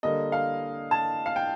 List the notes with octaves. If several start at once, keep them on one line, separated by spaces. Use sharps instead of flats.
D3 G3 A#3 D#5
F5
A5
F5
G5